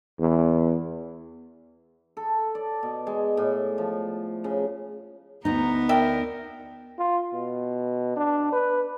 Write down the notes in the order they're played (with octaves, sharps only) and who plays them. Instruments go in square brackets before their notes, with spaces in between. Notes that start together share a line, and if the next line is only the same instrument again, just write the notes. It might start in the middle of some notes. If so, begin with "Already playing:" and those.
[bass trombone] E2
[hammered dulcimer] A4
D5
B2
G#3
A2
F3
C#3
[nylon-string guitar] D2 D#4 [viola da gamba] B3 [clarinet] A#5
[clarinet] A#4 [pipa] D5 E5 G5
[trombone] F4
B2
D4
B4